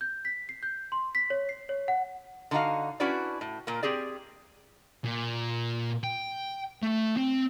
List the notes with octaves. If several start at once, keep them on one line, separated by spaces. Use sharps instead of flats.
G6
B6
C7
G6
C6
B6
C#5
C7
C#5
F#5
D3 F3 D#4 F4 F#4 F5
C#4 D4 E4 F#4 B4 D5
A2
A#2 A#3
C4 G4 G#4 D5
A#2
G5
A3
C4